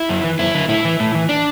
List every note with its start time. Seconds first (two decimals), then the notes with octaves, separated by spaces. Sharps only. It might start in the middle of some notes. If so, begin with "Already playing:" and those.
Already playing: E4
0.09 F#2
0.24 E3
0.39 F#2 E4
0.55 D3
0.69 A2 E4
0.85 E3
1.00 A2
1.15 E3
1.29 D4